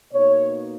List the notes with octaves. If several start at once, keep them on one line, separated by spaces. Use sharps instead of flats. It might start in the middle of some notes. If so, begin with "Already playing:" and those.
B2 A#3 D#4 C#5